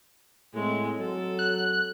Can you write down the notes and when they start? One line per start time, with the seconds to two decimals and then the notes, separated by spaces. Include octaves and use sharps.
0.54 A2 G#3 C4
0.99 F#3 A4
1.39 F#6